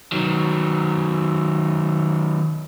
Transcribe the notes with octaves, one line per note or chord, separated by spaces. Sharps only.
D#3 F#3